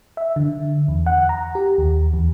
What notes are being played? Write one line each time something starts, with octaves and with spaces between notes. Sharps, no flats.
E5
D3
E2
F#5
A#5
G4
D#2
E2